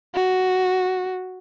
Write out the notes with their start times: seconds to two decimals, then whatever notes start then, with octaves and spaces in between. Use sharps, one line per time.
0.15 F#4